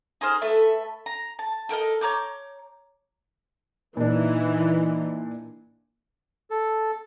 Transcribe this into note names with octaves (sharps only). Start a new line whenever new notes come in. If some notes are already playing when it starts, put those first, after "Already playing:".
D#4 G#4 C5 F6
A3 A4 B4 E5
A#5
A5
A4 A#4 C5 D#5
C#5 A#5 D6 G6
A#2 E3 D4 D#4
A4